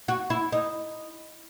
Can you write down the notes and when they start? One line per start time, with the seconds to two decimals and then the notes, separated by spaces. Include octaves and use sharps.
0.08 F#4
0.30 E4
0.52 D#4